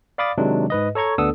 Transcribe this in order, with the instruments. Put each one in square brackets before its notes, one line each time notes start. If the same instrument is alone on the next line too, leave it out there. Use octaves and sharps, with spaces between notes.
[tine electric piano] D5 F5 B5 D6 D#6 A6
C3 D#3 F#3 G#3 D4
G#2 B4 D#5
A4 C#5 A#5 C#6 G#6
D2 B3 D4 A4 D#6 E6